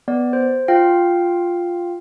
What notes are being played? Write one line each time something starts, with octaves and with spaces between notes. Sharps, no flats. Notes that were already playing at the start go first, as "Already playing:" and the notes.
B3 D5
C5
F4 F5 G5